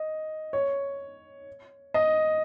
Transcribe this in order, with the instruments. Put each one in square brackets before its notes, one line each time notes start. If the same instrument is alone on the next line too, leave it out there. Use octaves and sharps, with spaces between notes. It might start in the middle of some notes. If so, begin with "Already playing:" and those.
Already playing: [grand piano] D#5
C#5
D#5